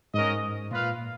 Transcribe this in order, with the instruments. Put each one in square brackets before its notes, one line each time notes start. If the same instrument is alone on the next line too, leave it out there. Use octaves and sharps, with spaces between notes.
[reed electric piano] G#2 [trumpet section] C#4 F#4 A#4 D#5
[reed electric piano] A#2 [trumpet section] F4 B4 F5